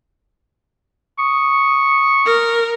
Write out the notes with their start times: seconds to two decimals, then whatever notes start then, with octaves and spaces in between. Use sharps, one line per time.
1.19 C#6 D#6
2.26 A#4